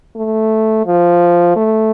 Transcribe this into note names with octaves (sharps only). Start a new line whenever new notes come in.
A3
F3
A3